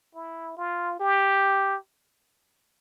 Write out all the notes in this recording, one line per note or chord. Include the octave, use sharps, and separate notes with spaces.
E4
F4
G4